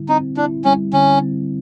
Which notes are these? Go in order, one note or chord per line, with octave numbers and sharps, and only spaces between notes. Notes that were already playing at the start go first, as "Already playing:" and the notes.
Already playing: D3 G3 E4
C4 D#4
D4 E4
G3 C#4
D3 C#4
C4